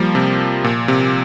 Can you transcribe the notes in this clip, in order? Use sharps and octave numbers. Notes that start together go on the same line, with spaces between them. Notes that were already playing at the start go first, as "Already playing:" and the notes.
Already playing: F3 G3 A#3
C3
A#2
C3